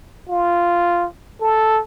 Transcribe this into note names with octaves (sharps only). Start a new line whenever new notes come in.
F4
A4